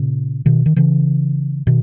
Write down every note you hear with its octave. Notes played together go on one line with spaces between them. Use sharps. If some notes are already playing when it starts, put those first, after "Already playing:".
Already playing: A#2 C#3
B2 D#3
D#3
C#3 E3
B2 D#3